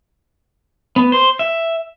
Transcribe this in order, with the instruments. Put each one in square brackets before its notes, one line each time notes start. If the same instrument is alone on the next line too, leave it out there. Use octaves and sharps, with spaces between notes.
[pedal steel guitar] B3
C5
E5